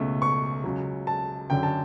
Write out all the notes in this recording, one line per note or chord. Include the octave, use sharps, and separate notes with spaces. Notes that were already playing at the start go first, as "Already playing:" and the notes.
Already playing: C#2 B2 A3
C#6
C#2 C#3 F#3
A5
F#2 D3 F#3 G5
A5